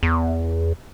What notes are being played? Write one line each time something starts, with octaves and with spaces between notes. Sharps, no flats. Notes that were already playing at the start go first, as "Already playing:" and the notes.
E2